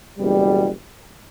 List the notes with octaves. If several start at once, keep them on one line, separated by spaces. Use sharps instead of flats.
F#1 E2 B2 G3